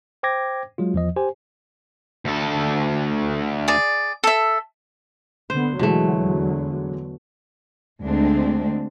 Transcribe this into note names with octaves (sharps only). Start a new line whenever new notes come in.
C5 G5 D6 G#6 A#6
F#3 G#3 F4
E2 F3 D#5
G4 C5 G#5
D2 A4
G#4 D5
A4 E5
D3 B3 C5
E2 B2 D3 E3 F#3 G#3 A3
D2 D3 G#3 A3 C4 D4